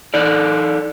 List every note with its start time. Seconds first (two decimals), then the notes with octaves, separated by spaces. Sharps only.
0.14 D#4 A4 D5